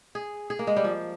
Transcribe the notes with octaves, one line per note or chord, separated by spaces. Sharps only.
G#4
G#4
A#3
G#3
G3
F3